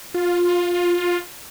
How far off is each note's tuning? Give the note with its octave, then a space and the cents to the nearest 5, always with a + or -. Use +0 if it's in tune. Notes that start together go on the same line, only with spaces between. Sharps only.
F4 +15